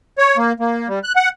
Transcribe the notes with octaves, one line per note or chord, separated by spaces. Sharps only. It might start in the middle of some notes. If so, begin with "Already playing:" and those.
C#5
A#3
A#3
G3
F#6
F#5